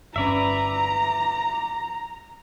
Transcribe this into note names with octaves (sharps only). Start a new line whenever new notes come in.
G1 C#4 B4 D5 E5 A#5